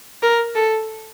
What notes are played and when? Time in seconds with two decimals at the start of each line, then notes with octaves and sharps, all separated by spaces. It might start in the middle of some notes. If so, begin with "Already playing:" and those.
0.23 A#4
0.55 A4